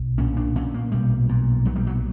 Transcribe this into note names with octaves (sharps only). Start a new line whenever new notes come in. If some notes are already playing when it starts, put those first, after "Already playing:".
Already playing: B1
A#2 C#4
D4
A#2 C#4
A#3
B1 G3
A#2
B1 F#3
G3
F#3